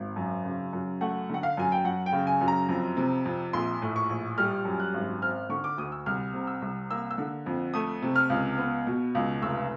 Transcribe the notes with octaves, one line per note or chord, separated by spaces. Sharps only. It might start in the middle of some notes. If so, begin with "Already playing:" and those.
Already playing: G#1
F#2
C#3
F#2
A3 F#5
D3 F#5
F5
F#2 G#5
G5
F#2 F#5
G5
C#3
G#5
F#2
A#5
F2
C3
F2
A#1 C6
A2
C#6
A#1
G3 F6
F#2
F#6
G#1
C4 F6
D3 C#6
D6
D2 D#6
E6
C2 F6
C3
E6
C2
A#3 E6
E6
D3
F2
A3 D#6
C3
F6
C#2
B3
B2
C#2
F1 E6